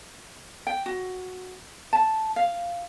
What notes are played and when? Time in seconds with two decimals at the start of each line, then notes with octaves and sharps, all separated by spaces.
0.67 G5
0.86 F#4
1.93 A5
2.36 F5